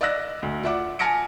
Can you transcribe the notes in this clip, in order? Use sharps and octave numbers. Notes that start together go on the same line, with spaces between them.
D5 D#5 F5 E6 F#6 A#6
D2
F4 D5 E5 F#5 D6
G#5 A5 F6 A#6 C#7 D7